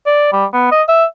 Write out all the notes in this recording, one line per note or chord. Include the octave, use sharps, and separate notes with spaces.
D5
G3
B3
D#5
E5